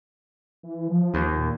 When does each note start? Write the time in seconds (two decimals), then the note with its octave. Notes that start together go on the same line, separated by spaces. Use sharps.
0.63 E3
0.90 F3
1.14 D#2
1.38 A#2